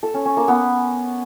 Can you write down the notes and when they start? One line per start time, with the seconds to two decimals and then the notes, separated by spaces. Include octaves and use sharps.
0.03 A4
0.14 C#4
0.25 C#4
0.37 A#3
0.48 B3